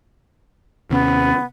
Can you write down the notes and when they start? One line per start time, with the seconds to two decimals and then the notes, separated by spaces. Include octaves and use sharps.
0.90 D#2 C3 B3 C#4